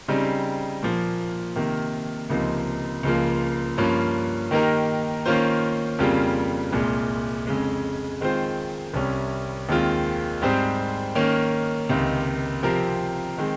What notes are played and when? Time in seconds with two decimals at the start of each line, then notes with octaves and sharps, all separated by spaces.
0.08 C#3 G3 C4 D#4
0.83 A#2 F3 A#3
1.56 C3 D#3 A#3
2.30 C#2 C3 F3 A#3 D#4
3.03 C#2 C#3 F3 A#3 F4
3.78 G2 F3 A#3 C#4 F4
4.51 D#3 A#3 D#4 G4 A#4
5.26 D#3 A#3 C#4 F4 C5
5.99 F2 C#3 G3 A#3 F4
6.73 C2 A#2 G#3
7.47 F2 C#3 G#3
8.21 D#3 G#3 C4 F4 C5
8.94 C2 C3 G3 C#4
9.69 D#2 D#3 G#3 C4 F4
10.42 G#2 G3 C4 G4 C5
11.15 D#3 A#3 C#4
11.89 C#2 C3 D#3
12.63 C3 F3 C4 G4 A#4
13.38 D#3 G#3 C4